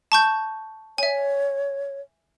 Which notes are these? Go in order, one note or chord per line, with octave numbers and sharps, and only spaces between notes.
A5 C#6 G6
C#5 E5 G#5